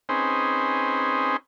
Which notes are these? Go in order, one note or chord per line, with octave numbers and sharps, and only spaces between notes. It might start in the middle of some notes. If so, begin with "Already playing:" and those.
C4 C#4 D#4 G#4 B4 C5